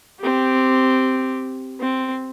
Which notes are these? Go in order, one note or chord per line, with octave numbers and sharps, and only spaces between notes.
C4 G4
C4